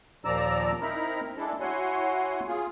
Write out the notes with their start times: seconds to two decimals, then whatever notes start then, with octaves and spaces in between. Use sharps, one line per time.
0.25 D#2 A#2 F3 D5 A#5 E6
0.81 C4 D#4 E4 A#4 A#5 B5
1.37 G#3 D4 E4 A4
1.60 E4 F#4 C#5 F#5 G#5 C6
2.48 F4 G#4